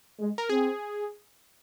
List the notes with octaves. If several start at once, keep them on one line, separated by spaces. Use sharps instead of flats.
G#3
A#4
C4 G#4